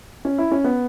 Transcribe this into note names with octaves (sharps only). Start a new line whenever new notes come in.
C#4
E4
C#4
B3